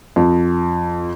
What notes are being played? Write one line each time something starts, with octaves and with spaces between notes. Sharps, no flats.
F2